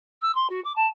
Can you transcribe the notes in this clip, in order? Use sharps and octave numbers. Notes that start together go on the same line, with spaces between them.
E6
C6
F#4
D6
A5